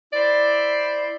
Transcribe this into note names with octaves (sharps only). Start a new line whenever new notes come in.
E4 C5 D5